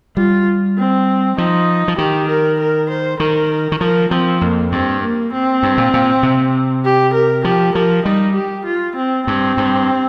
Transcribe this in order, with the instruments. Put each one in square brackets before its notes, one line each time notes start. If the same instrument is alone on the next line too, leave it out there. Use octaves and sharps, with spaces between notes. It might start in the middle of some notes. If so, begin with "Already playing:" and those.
[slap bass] G3 [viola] F4
[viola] C4
[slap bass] F3 [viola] D#4
[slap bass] F3
[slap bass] D#3 [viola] G4
[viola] A#4
A#4
C5
[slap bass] D#3 [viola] A#4
[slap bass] D#3
[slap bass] F3 [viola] A#4
[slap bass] F3 [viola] C4
[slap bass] F2 [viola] A#3
[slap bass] G2 [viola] C4
[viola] A#3
C4
[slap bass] G2
A#2
A#2
C3
[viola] G4
A#4
[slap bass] F3 [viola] G4
[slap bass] F3 [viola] A#4
[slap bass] G3 [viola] D#4
[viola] G4
F4
C4
[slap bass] G2 [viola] C4
[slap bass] G2